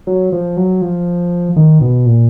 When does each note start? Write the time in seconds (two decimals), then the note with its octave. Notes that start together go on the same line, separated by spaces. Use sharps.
0.07 F#3
0.32 F3
0.57 F#3
0.82 F3
1.56 D#3
1.81 B2
2.06 A#2